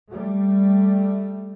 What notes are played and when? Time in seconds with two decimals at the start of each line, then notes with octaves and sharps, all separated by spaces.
0.10 G3 A3